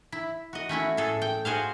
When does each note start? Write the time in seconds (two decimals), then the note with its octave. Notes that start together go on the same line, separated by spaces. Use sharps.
0.12 E4
0.53 F#4 D#5
0.69 A3 C#4 E4 F#4
0.97 A2 G#4 A4
1.22 G5
1.45 F#4 G#4 C5 F5